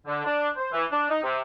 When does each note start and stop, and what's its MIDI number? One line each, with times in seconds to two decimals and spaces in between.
0.07 0.23 50
0.25 0.49 62
0.56 0.71 72
0.72 0.84 52
0.91 1.08 62
1.10 1.21 63
1.23 1.39 48